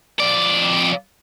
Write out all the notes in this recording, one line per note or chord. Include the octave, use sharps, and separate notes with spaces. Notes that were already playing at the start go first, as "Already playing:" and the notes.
F2 D5